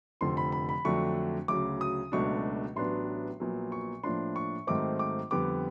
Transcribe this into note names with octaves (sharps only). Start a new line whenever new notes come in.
F1 F2 D3 F3 C6
B5
B5
B5
F2 D3 F#3 A3 D4 C#6
D2 C#3 F#3 D6
D#6
C#2 B2 F#3 A3 D4 C#6
A1 A2 F#3 B3 D4 C6
A#1 A#2 F#3 B3
C#6
A2 F3 A#3 D4 C6
C#6
G#2 D#3 F#3 A3 C4 D6
D6
F2 D3 G3 B3 D6